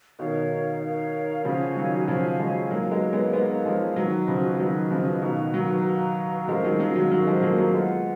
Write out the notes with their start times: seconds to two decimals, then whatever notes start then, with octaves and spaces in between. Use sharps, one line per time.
0.19 B2 D#3 D#4 A#4 C#5 F5
0.82 D#4 A#4 C#5 F5
1.44 C#3 F3 F#4 C#5 F5 G#5
1.76 D#3 F#3
2.07 C#3 F3 F#4 C#5 F5 G#5
2.39 F3 G#3
2.70 F#3 A#3 D#4 A#4 C#5 F5
2.91 G#3 B3
3.13 G#3 B3
3.33 G#3 B3 D#4 A#4 C#5 F5
3.65 F3 G#3
3.96 D#3 F#3 F#4 B4 D#5
4.28 C#3 F3
4.59 D#3 F#3 F#4 B4 D#5
4.91 C#3 F3
5.22 B2 D#3 F#4 B4 F5 A#5
5.54 D#3 F#3
5.85 F#4 B4 F5 A#5
6.48 F3 G#3 C#4 F#4 A#4 F5
6.64 D#3 F#3
6.79 D#3 F#3
6.95 D#3 F#3
7.10 D#3 F#3 C#4 F#4 A#4 F5
7.27 F3 G#3
7.42 F#3 A#3
7.58 F#3 A#3
7.73 G#3 B3 F4 B4 F#5